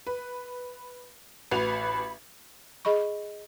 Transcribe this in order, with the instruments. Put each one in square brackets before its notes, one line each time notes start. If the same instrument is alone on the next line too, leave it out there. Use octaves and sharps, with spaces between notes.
[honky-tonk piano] B4
[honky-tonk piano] A1 F#4 F7 [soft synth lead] B4 [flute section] B5
[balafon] G#4 D#5 B5 C#6